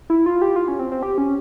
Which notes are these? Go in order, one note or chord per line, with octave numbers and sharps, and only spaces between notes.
E4
F4
G4
F4
C#4
C4
C4
G4
C#4